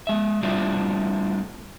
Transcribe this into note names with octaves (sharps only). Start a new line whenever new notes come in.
G#3 E5
G3 A3 C4 D4 E4 F4